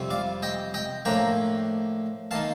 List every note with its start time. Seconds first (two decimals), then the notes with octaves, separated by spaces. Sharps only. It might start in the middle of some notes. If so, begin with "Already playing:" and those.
Already playing: F2 C3 G3 C4
0.10 D5 F5
0.42 D#5 G5
0.74 D#5 G5
1.05 A2 F3 A#3 D4 G5 A#5
2.31 D#3 A#3 D#4 F5 A5